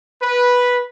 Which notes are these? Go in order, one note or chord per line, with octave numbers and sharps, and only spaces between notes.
B4